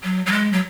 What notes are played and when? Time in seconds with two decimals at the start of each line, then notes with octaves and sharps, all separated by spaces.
0.03 F#3
0.26 F#3
0.32 G#3
0.53 F#3